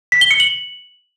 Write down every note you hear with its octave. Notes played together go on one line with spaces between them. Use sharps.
B6
G7
C#7
F#7